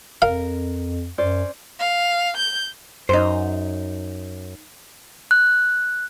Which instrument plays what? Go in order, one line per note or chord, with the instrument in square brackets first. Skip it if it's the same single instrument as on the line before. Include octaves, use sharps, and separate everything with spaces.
[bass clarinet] F2 [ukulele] A#4 [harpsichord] F5
[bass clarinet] F#2 [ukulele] C#4 C5 D5
[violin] F5
G6
[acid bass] F#2 [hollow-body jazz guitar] D#4 C5
[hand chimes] F#6